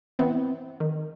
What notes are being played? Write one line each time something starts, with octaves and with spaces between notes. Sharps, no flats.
E3 B3 C4
D#3